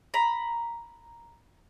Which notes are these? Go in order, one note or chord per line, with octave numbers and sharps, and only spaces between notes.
A#5 B5